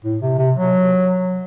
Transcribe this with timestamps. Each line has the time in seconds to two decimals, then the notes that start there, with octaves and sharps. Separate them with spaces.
0.05 A2
0.22 C3
0.38 C3
0.55 F#3